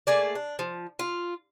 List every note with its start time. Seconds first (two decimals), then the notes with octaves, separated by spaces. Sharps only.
0.07 A3 A#3 G#4 D5
0.35 D4
0.59 F3
0.99 F4